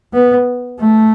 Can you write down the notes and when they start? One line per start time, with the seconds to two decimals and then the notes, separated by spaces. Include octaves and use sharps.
0.13 B3
0.80 A3